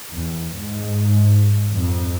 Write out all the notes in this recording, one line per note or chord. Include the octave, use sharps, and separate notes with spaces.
E2
G#2
F2